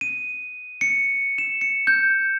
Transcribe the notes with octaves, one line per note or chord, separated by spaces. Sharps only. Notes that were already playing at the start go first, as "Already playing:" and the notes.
D#7
C#7
E7
C#7
G6